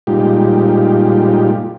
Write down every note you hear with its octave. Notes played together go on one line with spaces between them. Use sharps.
A#2 G3 G#3 D#4 F4 G4